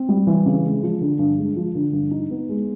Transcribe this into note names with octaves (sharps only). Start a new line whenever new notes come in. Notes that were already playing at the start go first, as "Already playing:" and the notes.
Already playing: C4
G3
E3
C#3
G#3
F3
D3
G2
G#3
F3
D3
G2
D#4
B3
G#3